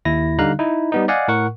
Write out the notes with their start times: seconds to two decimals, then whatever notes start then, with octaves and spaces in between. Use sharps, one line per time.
0.05 D#2 E4 A#6
0.39 D3 G3 D#4 F5 A#5 F#6
0.59 D#4 E4
0.92 G3 B3 D#4
1.08 D5 D#5 F5 F#5 G#5
1.28 A2 A#4 F#5 C#6